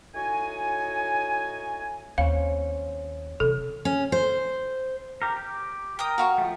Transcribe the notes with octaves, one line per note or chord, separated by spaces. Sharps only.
A2 D#4 F#4 C#5 G#5
D#2 C4 C#4 F5
C3 E3 A4
C#4
C5
G4 A#4
G4
A#4 G5 D#6
F#4 F5 C#6
F3 A3